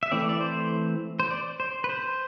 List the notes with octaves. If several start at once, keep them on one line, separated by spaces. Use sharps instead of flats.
E5
E3 A3 C4 D5
D5
C5
C5
D5
C5
B4
C5